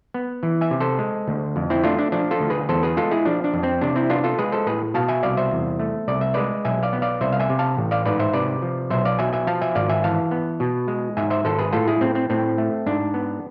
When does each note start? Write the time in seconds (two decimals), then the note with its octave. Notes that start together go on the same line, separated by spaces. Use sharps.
0.14 B3
0.43 E3
0.61 E5 G#5
0.71 C3
0.80 A4 C5
0.99 G#3
1.28 D2
1.56 F2
1.70 C4 E4
1.84 A3 D4 F4
1.99 D4
2.12 F3 D4
2.31 F4 A4
2.40 D2
2.50 G#4 B4
2.69 E2 A4 C5
2.83 G#4 B4
2.97 G#3 F4 A4
3.11 E4 G#4
3.25 F3 D4
3.44 D4
3.54 F2
3.63 C4
3.81 C3 D4
3.95 C4 E4
4.10 B3 D4 F4
4.24 F4 A4
4.39 G#3 G#4 B4
4.52 A4 C5
4.67 A2 G#4 B4
4.94 B2 F5 A5
5.08 E5 G#5
5.23 C2 D5 F5
5.37 C5 E5
5.51 E2
5.79 A3
6.08 C2 D5
6.21 E5
6.34 G#3 B4 D5
6.65 B1 E5 G#5
6.83 D5 F5
6.93 B3
7.02 D5 F5
7.21 C2 C5 E5
7.32 F5
7.40 E5 G#5
7.50 C3
7.59 F5 A5
7.77 A1
7.91 D5 F5
8.06 G#2 B4 D5
8.19 C5 E5
8.33 C3 B4 D5
8.62 F3
8.90 B1 C5 E5
9.05 D5 F5
9.19 B2 E5 G#5
9.33 E5 G#5
9.47 F3 F5 A5
9.62 E5 G#5
9.75 G#1 D5 F5
9.89 E5 G#5
10.04 E3 F5 A5
10.31 B3
10.60 B2
10.88 G#3
11.17 G#2 E5 G#5
11.30 C5 E5
11.45 G#1 A4 C5
11.58 G#4 B4
11.73 A2 F4 A4
11.88 E4 G#4
12.01 A2 C4
12.15 C4
12.30 A2 C4
12.58 A3
12.86 G#2 D4
13.14 B3